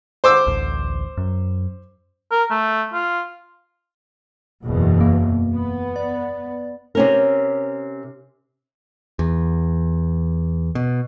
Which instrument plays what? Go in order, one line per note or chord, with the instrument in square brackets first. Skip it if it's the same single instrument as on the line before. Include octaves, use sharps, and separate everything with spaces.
[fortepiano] C5 D6 E6
[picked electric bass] A1 D2 D3
F#2
[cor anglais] A#4
A3
F4
[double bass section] F#1 E2 B2
[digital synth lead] A#3
[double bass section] B3
[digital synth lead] D5
[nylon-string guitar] C3 C#4 A#4
[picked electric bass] E2
B2